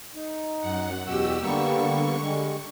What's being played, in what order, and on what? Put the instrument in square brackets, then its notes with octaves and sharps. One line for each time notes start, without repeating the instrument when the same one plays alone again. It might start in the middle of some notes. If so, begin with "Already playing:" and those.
[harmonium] D#4
[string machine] F#2 F#5
[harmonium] E2 B2 F#4 [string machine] G4 E6
[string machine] D3 C#6 [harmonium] G3 A#3 B3
[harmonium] G3 G#3